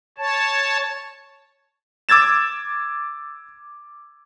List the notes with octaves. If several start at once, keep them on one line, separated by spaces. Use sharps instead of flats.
C#5 A5
D6 E6 G#6 A6 E7